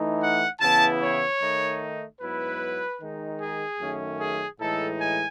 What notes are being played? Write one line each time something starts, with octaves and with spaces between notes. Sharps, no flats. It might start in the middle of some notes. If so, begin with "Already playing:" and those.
Already playing: E3 A3 D#4
F#5
C#3 E3 B3 E4 A5
C#5
D#3 A3 D#4
G#2 F#3 B3 E4 B4
D#3 G#3 D#4
G#4
F#2 D#3 A3 C#4
G#4
A2 E3 G#3 D#4 A4
G#5